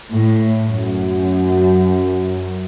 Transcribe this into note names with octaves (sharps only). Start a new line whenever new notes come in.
A2
F#2